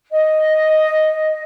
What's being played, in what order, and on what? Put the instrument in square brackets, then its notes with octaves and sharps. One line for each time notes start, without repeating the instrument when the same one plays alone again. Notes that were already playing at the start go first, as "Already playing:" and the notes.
[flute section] D#5